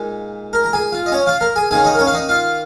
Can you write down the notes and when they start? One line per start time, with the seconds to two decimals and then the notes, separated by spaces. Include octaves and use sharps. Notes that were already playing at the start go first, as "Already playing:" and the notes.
Already playing: A#2 G#3 D#4
0.53 A#4 A#5
0.64 A#5
0.73 G#4 G#5
0.92 F4
1.06 D#5
1.12 C#4 C#5
1.27 F4 F5
1.41 A#4 A#5
1.56 G#4 G#5
1.71 D#3 A#3 C#4 G#4 G#5
1.85 D#4 D#5
1.95 A#4
1.99 C#4 C#5
2.07 F5
2.13 D#4 D#5
2.29 F4 F5